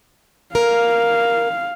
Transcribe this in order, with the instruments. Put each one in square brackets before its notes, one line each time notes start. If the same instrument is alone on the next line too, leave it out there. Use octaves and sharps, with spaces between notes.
[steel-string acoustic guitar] A#4 [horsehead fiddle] F5